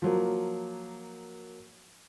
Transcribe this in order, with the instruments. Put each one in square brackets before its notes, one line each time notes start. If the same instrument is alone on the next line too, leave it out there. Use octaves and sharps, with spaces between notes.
[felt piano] F3 F#3 A#3